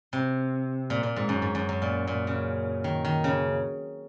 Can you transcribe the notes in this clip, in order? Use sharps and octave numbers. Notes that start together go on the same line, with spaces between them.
C3
A#2
A#2
G#2
F#2
G#2
F#2
F#2
A#2
A#2
C#3
D#3
D#3
C#3